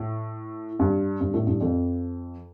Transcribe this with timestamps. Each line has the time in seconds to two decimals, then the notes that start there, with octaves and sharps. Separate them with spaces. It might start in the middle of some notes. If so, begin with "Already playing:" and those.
Already playing: A2
0.79 G2
1.21 G2
1.34 A2
1.47 G2
1.61 F2